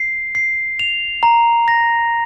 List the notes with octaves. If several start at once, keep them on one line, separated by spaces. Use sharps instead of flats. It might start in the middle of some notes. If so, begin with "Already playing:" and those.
Already playing: C7
C7
F7
A#5
A#6